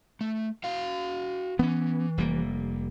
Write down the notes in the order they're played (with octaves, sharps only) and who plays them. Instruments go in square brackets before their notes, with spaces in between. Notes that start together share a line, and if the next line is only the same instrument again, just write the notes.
[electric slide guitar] A3
F#4 F5
[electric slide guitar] E3 [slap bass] B3 C#4
[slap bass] F1 G3 A#3